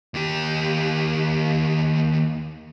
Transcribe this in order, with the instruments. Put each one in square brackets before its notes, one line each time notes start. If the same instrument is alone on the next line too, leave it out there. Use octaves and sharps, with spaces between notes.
[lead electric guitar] D#2 G4